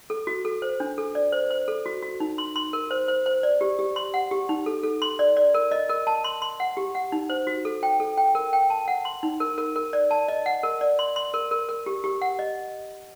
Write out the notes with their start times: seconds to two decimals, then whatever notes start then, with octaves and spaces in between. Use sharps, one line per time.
0.10 A4
0.27 F#4
0.45 A4
0.62 C5
0.80 D4
0.98 A4
1.15 D5
1.32 C5
1.50 C5
1.68 A4
1.86 F#4
2.03 F#4
2.20 D#4
2.38 C6
2.56 C6
2.73 A#4
2.91 C5
3.08 C5
3.26 C5
3.43 D5
3.61 G4
3.79 G4
3.96 C6
4.14 F#5
4.31 G4
4.49 D#4
4.66 A4
4.83 A4
5.02 C6
5.19 D5
5.37 D5
5.54 A#4
5.71 D#5
5.89 A#4
6.07 A5
6.24 C6
6.42 C6
6.60 F#5
6.77 G4
6.95 F#5
7.12 D#4
7.30 C5
7.47 F#4
7.65 A4
7.83 G5
8.00 A4
8.17 G5
8.35 A#4
8.53 G5
8.70 A5
8.88 F#5
9.05 C6
9.23 D#4
9.40 A#4
9.58 A#4
9.76 A#4
9.93 D5
10.11 A5
10.28 D#5
10.46 F#5
10.63 A#4
10.81 D5
10.99 C6
11.16 C6
11.34 A#4
11.51 A#4
11.69 A#4
11.86 G4
12.04 G4
12.22 F#5
12.39 D#5